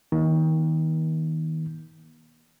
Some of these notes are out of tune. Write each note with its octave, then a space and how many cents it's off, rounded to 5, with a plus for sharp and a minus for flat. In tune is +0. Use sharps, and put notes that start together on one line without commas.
D#3 +30 A#3 +40